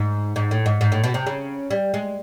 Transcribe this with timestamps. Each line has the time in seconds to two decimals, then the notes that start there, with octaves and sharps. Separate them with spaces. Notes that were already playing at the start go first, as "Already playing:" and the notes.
Already playing: G#2
0.36 G#2
0.51 A2
0.66 G#2
0.81 G#2
0.92 A2
1.04 B2
1.14 C3
1.27 C#3
1.71 G3
1.94 G#3